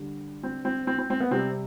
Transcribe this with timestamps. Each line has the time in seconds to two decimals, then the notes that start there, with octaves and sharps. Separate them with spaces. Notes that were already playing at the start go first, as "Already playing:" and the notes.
Already playing: D3 G3
0.43 C4
0.65 C4
0.87 C4
0.98 C4
1.10 C4
1.20 B3
1.31 C3 G3 C4